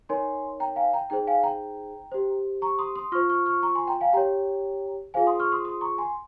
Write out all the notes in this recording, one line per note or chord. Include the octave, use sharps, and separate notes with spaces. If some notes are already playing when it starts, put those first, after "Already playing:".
D#4 A#4 C#5 G#5 C6
G5 A#5
F5 G#5
G5 A#5
D#4 G#4 C5 G5
F5 G#5
G5 A#5
G4 C5
A#5 C#6
C6 D#6
C6 D#6
F4 C5 C#6 F6
C#6 F6
C#6 F6
A#5 C#6
G#5 C6
G5 A#5
F5 G#5
G4 C#5 G5 A#5
F4 G#4 C5 F5 G#5
C6 D#6
C#6 F6
C6 D#6
C6 D#6
A#5 C#6
G#5 C6